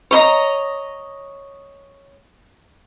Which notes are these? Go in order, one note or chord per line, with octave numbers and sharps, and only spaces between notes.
C#5 D#5 A#5